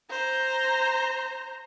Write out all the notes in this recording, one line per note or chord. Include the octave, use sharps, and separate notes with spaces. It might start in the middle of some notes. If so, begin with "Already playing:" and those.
C5 A#5